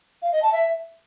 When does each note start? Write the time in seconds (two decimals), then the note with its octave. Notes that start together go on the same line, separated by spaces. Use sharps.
0.22 F5
0.32 D#5
0.42 A5
0.52 E5